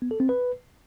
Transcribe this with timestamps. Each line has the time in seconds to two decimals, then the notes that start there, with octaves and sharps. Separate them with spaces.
0.02 B3
0.11 A4
0.20 C4
0.29 B4